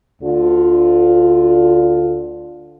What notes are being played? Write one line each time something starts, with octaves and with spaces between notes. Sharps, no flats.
D2 D3 F4